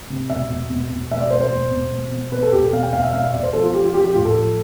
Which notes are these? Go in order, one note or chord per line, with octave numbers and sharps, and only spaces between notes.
C3
B2 E5
B2
B2
B2
B2 E5
D5
B2 C5
C5
B2
B2
B2
B2
B2 B4
A4
B2 G4
A4
B2 F5
G5
B2 F5
E5
B2 F5
E5
B2 D5
C5
F3 A4
F4
F3 G4
F4
F3 G4
G4
A2 F4
A4
F3